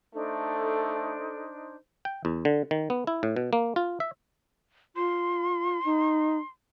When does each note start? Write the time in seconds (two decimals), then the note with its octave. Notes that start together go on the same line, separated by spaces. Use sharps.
0.14 A3 D4 D#4 A4 C5
2.05 G5
2.25 E2
2.45 D3
2.71 D#3
2.90 B3
3.07 E4
3.23 A2
3.36 B2
3.53 A#3
3.76 F4
4.00 E5
4.96 F4 C6
5.85 D#4